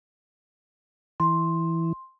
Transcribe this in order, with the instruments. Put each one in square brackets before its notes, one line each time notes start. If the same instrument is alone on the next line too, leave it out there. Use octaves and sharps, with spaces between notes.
[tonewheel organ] E3 [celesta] C6